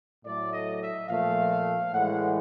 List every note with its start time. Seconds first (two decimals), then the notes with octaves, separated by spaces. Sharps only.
0.24 A2 F#3 A3 D5
0.52 D#5
0.81 E5
1.08 A#2 F3 A3 F5
1.92 A2 E3 G#3 F#5